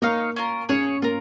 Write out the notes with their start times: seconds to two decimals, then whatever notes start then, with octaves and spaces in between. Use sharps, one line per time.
0.02 A#3 D#4 C#5 F5
0.36 C#4 F4 A#4
0.69 C#4 G#4 C#5 F5
1.02 A#3 F4 A#4